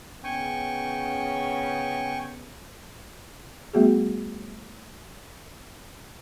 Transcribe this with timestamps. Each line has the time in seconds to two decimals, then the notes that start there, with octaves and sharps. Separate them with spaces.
0.24 C#3 B3 C#4 G5 G#5 C#6
3.73 G3 A3 B3 F#4 G#4